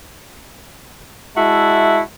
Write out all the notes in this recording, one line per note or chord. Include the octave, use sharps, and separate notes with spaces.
G#3 E4 F#4 E5 A5